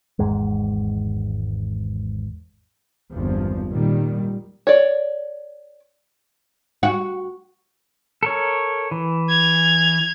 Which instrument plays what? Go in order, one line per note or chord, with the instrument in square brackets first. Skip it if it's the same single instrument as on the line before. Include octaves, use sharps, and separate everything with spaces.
[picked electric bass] G#1 E2 G#2 G#3
[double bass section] G#1 E2 G2 F3
A#2 D#3 G3
[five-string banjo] C#5 D5
[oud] F#4
[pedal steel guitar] A4 A#4 C#5
E3
[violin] G#6 F7